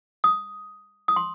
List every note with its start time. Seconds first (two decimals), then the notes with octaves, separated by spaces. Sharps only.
0.24 D#6
1.08 D#6
1.16 C6